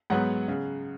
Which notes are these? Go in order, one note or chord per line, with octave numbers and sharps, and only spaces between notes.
G#2 F#3 B3 F#5
C#3